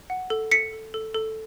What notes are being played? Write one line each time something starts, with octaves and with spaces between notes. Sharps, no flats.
F#5
A4
A4 B6 C#7
A4
A4
A4